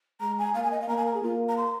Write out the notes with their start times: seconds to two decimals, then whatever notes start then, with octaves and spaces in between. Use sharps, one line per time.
0.20 G#3 A#5
0.38 G#5
0.54 A#3 F5
0.63 G#5
0.71 D#5
0.80 F5
0.88 A#3 A#5
0.97 G#5
1.06 A#5
1.14 G#4
1.22 A#3 F4
1.48 A#5
1.57 C6